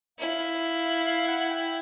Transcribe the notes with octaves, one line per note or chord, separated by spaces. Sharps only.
E4 F5
F5
F#5
G5